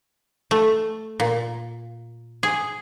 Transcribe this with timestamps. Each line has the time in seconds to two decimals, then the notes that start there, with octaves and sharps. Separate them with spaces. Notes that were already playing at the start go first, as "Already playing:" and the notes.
0.51 A3
1.20 A#2
2.43 G#4